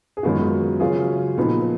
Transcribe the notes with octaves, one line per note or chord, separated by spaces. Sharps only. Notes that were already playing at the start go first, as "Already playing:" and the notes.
G#4
F#2 D#3 G#3 B3 F4 F#4
C#3 F#3 C#4 F4 G#4
A#2 F3 B3 D#4